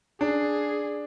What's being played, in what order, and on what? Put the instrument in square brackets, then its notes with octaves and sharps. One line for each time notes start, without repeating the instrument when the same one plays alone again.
[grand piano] D4 [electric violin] G#4